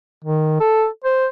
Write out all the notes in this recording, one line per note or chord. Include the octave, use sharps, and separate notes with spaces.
D#3
A4
C5